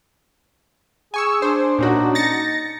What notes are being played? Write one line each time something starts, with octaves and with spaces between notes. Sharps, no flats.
G#4 G#5 C#6 E6
D4 C5
A#2 C#4 D#4 F#4
A6 A#6 C#7